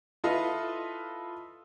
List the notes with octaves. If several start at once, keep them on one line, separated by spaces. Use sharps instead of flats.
E4 F4 A4 B4 D#5 F5